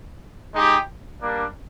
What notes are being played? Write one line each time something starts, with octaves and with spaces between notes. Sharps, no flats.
G#3 D#4 G4
G3 A#3 D4